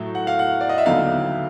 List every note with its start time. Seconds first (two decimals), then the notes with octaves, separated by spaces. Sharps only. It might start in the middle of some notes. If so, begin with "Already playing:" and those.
Already playing: A2 F#3 A3
0.15 F#5
0.27 F5
0.39 F#5
0.61 D5
0.69 D#5
0.78 E5
0.86 D#2 D3 F#3 B3 E4 F5